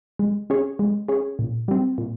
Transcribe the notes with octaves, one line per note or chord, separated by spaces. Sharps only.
G#3
C#4 G#4 C#5
G#3
C#4 G#4 C#5
A#2
G3 C4
A#2